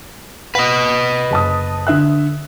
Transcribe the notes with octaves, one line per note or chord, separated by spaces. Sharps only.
B4 D#5 F#5
F#1 A5 D#6
D3 E5 F#6